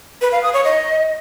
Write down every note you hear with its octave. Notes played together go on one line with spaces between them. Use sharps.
B4
F5
D#6
C#5
D#5